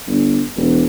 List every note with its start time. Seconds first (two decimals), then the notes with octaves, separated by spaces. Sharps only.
0.07 G1
0.57 E1